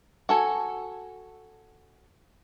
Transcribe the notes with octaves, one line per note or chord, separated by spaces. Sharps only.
F#4 A4 G#5